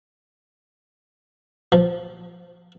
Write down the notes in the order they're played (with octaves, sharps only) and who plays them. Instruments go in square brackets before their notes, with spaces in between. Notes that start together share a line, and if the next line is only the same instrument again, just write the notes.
[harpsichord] F3